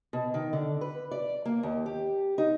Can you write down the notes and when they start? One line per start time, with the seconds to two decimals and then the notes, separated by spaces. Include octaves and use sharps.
0.13 B2
0.34 D#3
0.53 D3
0.81 B4
1.11 D5
1.46 A#3
1.63 D#2
1.86 G4
2.38 D#4